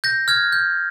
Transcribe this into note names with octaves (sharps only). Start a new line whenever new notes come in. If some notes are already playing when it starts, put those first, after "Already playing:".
G6 A#6
F6 G#6
G6